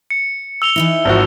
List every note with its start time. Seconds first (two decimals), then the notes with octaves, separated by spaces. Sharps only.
0.10 C#7
0.62 E6 F7 G7
0.76 E3 D#4 E4
1.05 G#1 F3 F#4